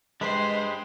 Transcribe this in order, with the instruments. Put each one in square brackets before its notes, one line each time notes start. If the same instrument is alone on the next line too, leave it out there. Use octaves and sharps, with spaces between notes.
[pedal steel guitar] G#3 B4 [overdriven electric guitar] D4 G4 [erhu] C5 [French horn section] D#5